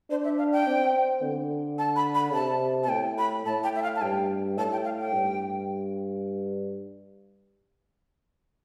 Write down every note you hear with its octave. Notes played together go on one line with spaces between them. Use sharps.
D4 C5
E5
F5
G5
C4
D3
A5
B5
B5
C3 A5
A5
A2 G5
B5
A2 A5
G5
E5
F5
A5
G2 G5
A2 A5
G5
F5
G5
G2